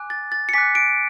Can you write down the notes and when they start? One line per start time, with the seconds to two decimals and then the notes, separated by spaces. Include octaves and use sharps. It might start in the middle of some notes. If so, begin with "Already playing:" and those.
Already playing: G#5 D6 F#6
0.10 A6
0.32 A6
0.49 C#7
0.53 G#5 D6 F#6 B6
0.75 D7